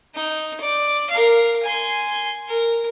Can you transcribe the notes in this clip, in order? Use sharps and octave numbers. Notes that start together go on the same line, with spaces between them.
D#4
D5
A#4 F5
G#5 C6
A#4